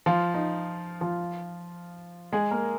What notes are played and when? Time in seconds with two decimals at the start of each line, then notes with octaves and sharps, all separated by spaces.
0.06 F3 F4
0.34 D#4
1.01 F3 F4
2.33 G#3 G#4
2.51 A#3 A#4